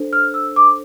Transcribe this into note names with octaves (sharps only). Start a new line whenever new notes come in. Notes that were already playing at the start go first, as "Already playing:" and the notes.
Already playing: D4 A4 C5
F6
E6
D6